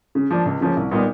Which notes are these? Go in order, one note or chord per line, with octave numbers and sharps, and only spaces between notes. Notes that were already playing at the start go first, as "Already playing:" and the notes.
C#3
F3 A#3 D4
C#2
C#3 F3 A#3 C#4
C2
A#2 G3 B3 D#4